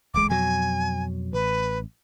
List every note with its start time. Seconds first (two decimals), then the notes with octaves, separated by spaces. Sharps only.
0.14 D1 A1 G#3 D6
0.30 F2 B2 F#3 G#5
1.33 A1 B4